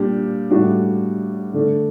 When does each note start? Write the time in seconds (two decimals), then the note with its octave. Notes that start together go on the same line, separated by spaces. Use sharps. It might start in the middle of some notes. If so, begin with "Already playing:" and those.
Already playing: A#2 G3 D4 G4
0.50 A2 G3 D4 F#4
1.54 D3 A3 D4